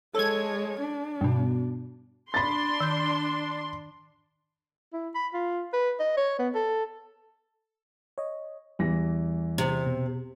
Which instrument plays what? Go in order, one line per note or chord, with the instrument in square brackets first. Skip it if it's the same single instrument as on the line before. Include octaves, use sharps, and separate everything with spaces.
[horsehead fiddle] G#3 C#5 [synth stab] A4 G#6
[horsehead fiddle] D4
[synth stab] G2 B2
[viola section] D4 C6 [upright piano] B5 A6
[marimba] D#3 G6
[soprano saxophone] E4
B5
F4
B4
D#5
C#5
B3
A4
[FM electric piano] C#5 D#5
[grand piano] E2 E3 A#6 [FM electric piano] G3
[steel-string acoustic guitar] C3
[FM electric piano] B2